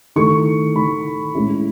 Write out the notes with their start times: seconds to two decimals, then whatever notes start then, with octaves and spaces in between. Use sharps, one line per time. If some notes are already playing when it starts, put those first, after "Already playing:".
0.16 D#3 A3 E4 C#6
0.75 D#3 A3 E4 B5
1.35 A2 G#3 C#4 E4